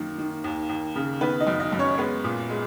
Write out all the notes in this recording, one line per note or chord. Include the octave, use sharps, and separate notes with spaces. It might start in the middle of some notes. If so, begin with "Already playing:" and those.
Already playing: F#2 D#3 A#3
D#3
D#2
D#2
C#3
D#3 B3 B4
D#4 D#5
F#2
D#4 D#5
F#2
C#4 C#5
C#5
G#3 B3 B4
A#2
G#3